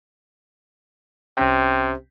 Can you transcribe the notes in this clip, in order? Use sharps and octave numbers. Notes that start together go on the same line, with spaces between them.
C2 C3 C#4 G5